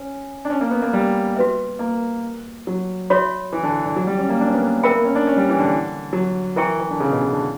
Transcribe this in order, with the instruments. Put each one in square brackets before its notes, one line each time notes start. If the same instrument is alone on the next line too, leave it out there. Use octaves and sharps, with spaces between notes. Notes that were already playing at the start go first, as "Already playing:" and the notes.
Already playing: [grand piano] C#4
D4
C#4
A#3
B3
A#3
G3
[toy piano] F#4 B4 E5
[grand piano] A#3
F#3
[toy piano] F#4 C#5 E5 B5
[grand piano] E3
D3
D3
F#3
G3
C#4
A#3
D4
C#4
B3
A#3
[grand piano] B3 [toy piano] A#4 E5 G5 B5
[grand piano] A#3
C#4
D4
C#4
G3
E3
D3
F#3
[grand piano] E3 [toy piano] A#4 E5 G5 A#5 C#6
[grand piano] E3
D3
C#3
B2
C#3
D3